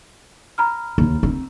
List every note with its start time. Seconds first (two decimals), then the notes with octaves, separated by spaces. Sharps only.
0.58 A#5 B5 F6
0.98 D#2
1.23 C4